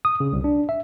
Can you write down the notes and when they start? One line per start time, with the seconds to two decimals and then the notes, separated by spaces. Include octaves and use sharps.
0.05 D#6
0.20 C#3
0.33 C2
0.44 D4
0.69 E5